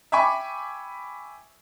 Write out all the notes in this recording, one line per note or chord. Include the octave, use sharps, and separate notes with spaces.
E5 G5 G#5 B5 C#6 D6